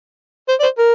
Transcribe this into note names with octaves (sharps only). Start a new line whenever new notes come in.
C5
D5
C5
A#4